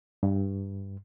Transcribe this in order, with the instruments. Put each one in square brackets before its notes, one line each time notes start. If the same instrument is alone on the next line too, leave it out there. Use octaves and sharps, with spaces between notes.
[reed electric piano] G2